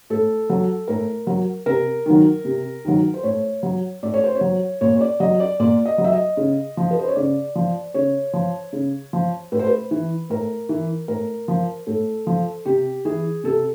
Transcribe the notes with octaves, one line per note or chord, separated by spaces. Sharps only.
A2 A4
F#3
A2 A#4
F#3
C3 A#4
D#3 F#3
C3
D#3 F#3
C5
A2 C#5
F#3
A2 D5
C#5
C5
C#5
F#3
A#2 C#5
C#5
D5
F#3 D#5
D5
A#2 D5
D#5
F#3
E5
D#5
C#3
F3
B4
C5
C#5
C#3 D5
F3
C#3 C#5
F3
C#3
F3
A2 B4
C5
B4
E3
A2 A#4
E3
A2 A#4
F3
A2 A4
F3
C3 G4
E3 G#4
C3 A4